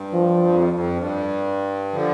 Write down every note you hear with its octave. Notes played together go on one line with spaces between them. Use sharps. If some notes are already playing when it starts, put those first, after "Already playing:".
Already playing: G2
F3
F2
F2
G2
D3 F3